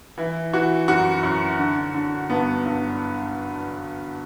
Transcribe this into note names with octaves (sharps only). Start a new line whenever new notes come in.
E3 E4
E3 F#4
F#2 F#4
F#2
D3
D3
G2 B3
G2